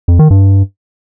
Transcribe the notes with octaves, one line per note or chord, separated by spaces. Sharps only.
F2
D#3
G2